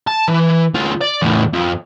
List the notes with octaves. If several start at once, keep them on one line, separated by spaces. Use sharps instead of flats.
A5
E3
D2 F4
D5
E2 A2
F2